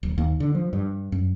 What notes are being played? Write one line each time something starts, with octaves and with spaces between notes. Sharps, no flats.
D1
D#2
D3
F3
G2
F#2